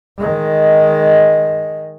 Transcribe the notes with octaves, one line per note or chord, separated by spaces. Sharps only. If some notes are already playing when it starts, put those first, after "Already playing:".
D#3 G#3